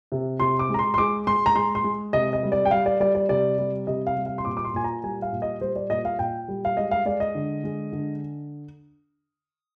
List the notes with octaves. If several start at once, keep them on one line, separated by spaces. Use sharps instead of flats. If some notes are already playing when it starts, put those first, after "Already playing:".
C3
C3 C6
D6
G#3 A#5
C6
C6
G#3 D6
G#3 C6
A#5
G#3 C6
C6
G#3
C3 D#5
D#5
G3
D5
G5
G3 F5
D5
G3 D5
D5
C3 D5
G3
C3 D#5
F5
G3
F5
C6
A#2 D6
D6
C6
A#2 G#5
A#5
G3 G#5
F5
A#2
D#5
G3 C5
D5
A#2 D#5
F5
A#2 G5
G3
F5
G#3 D#5
F5
G#3 D5
D#5
D3
G#3
D3